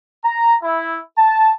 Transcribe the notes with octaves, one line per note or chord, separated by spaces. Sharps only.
A#5
E4
A5